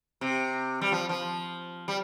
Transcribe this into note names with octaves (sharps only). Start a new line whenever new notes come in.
C3
G3
F3
F3
G3